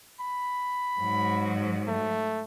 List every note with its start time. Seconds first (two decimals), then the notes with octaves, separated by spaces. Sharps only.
0.20 B5
1.00 G#2 F#3
1.87 A3